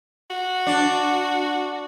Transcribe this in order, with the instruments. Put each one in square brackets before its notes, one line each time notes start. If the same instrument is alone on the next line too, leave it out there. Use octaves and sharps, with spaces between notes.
[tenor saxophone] F#4
[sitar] D4